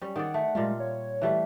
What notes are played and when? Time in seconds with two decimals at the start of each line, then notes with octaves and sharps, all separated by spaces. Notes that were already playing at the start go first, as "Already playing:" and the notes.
0.02 G3 C#4
0.16 D#3 G#4 D5 F#5
0.34 A3
0.55 A#2 G3 G#3 F4
0.80 C#5
1.22 E3 G3 A3